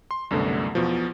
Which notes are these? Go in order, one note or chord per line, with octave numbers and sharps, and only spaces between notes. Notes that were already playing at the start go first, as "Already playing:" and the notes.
C6
C2 F#2 B2 D3 A3
E2 B2 F3